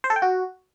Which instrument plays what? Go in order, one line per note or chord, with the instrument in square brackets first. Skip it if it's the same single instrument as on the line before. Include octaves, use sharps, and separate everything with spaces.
[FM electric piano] C5
A4
G5
F#4